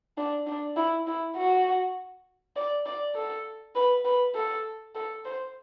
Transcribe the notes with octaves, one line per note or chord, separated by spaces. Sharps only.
D4
D4
E4
E4
F#4
D5
D5
A4
B4
B4
A4
A4
C5